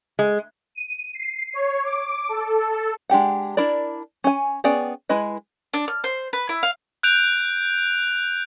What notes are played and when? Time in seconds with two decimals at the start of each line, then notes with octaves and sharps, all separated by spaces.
0.19 G#3
0.75 D#7
1.14 C7
1.54 C#5
1.85 D6
2.29 A4
3.10 G#3 D4 G4 F#5
3.57 D4 E4 A#4 D5
4.24 C#4 G#5
4.64 B3 C#4 G#4 D5 G5
5.09 G#3 E4 B4 D#5
5.73 D4
5.88 F6
6.04 C5
6.33 B4
6.49 E4
6.63 F5
7.03 F#6 G6 D7 F7